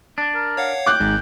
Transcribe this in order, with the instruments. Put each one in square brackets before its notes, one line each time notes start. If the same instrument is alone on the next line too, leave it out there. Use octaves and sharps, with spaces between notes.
[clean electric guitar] D4
[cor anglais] A#4
[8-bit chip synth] C#5 F5 F#5
[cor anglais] G5 [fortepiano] D6 F#6
[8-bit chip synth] G#1 [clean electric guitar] G#2